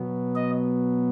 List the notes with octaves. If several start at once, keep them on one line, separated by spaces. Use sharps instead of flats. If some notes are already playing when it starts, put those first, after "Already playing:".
Already playing: B2 F#3 B3
D#5